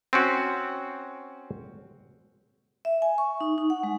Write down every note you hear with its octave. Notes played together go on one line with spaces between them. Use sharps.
C4 C#4 F#4
E5
G#5
C#6
D#4
D#4
F#5
G#3